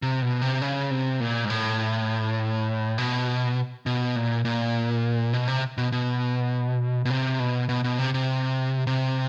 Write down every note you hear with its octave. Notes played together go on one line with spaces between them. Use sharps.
C3
B2
C3
C#3
C3
A#2
G#2
A2
B2
B2
A#2
A#2
B2
C3
B2
B2
B2
C3
B2
B2
B2
C3
C3
C3